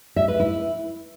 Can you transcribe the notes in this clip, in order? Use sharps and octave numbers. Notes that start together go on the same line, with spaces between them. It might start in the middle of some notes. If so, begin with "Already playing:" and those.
E5
B4
E4